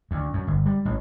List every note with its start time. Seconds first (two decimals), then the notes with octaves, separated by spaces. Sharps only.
0.11 D2
0.33 F#2
0.47 G1
0.66 G3
0.85 A1